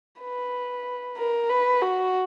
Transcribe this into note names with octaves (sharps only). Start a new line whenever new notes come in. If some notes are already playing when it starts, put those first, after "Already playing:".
B4
A#4
B4
F#4